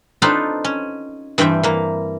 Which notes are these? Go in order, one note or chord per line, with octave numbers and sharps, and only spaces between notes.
C4 D4 D#4 F4 A4 B4
C#4
G2 E3 C4 E5 G5
E3 A#3